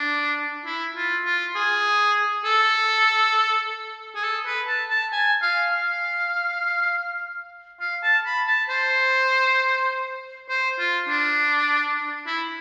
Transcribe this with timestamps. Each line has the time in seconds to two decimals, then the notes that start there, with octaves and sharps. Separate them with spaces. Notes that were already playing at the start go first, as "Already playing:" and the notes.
Already playing: D4
0.66 E4
0.96 F4
1.25 F4
1.56 G#4
2.45 A4
4.16 G#4
4.24 A4
4.46 B4
4.68 A5
4.90 A5
5.13 G#5
5.42 F5
5.73 F5
7.81 F5
8.03 A5
8.26 B5
8.47 A5
8.70 C5
10.49 C5
10.79 F4
11.09 D4
12.27 E4